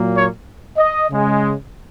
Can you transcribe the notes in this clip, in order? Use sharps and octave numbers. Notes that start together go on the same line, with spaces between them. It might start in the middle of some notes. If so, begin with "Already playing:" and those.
Already playing: A#2 F#3 A#3
C#5
D#5
C#3 G#3